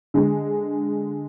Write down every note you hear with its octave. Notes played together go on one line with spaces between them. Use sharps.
D3 G#3